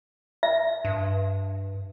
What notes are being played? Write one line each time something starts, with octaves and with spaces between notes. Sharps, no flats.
E5
G2